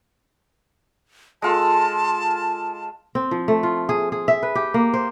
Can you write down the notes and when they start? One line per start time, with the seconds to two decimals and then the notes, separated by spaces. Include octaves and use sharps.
1.42 G#3 F4 A4 A5
3.15 C4
3.31 F3
3.48 A3
3.63 F4
3.89 G#4
4.12 G#4
4.28 E5
4.43 B4
4.55 G4
4.74 A#3
4.94 C5